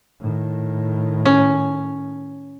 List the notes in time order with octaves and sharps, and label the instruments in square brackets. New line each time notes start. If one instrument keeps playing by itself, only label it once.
[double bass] A2 D#3
[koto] C#4